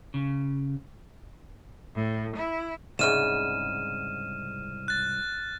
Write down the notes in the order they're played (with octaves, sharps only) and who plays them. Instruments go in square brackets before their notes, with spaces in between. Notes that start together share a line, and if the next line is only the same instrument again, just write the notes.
[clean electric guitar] C#3
[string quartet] A2
E4
[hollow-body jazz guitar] C2 G#2 C#3 [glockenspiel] F6 D#7 E7
[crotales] F#6 A6